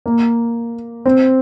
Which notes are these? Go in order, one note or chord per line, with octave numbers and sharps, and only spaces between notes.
A#3
C4